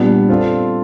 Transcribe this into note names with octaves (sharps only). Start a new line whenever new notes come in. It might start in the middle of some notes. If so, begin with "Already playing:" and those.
Already playing: A#2 G3 B3 D4
C4 F4 A4 D5